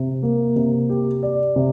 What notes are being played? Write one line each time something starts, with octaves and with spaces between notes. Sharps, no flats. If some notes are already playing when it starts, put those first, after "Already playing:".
Already playing: C3
A#3
C3
G4
D5
C3